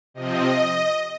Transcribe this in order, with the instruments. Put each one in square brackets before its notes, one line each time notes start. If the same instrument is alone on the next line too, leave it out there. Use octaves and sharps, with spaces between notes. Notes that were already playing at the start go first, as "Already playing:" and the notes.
[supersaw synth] C3 F3 C4 D#5